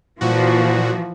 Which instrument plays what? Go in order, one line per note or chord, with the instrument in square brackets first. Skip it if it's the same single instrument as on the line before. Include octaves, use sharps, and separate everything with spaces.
[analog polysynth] A#2 F#4 [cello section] E3 F3